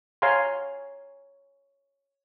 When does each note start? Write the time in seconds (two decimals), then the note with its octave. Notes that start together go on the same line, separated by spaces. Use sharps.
0.22 C#5 F5 G#5 A#5 C6